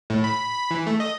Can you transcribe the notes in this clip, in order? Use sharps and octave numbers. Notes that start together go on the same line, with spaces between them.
A2
B5
B5
E3
A3
D#5